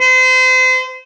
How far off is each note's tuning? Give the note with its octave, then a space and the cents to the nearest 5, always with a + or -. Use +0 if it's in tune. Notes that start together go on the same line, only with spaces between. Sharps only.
C5 -35